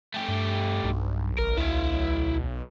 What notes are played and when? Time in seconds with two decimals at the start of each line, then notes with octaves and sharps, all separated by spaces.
0.14 A3 G4
0.28 G2
0.84 B1 G2
1.39 G#1 A#4
1.57 D2 E4 F5